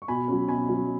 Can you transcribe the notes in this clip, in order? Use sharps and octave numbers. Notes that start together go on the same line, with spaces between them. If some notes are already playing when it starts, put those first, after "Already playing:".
C#6
B2 G#5 B5
F#3 C#4
B2 G#5 B5
F#3 C#4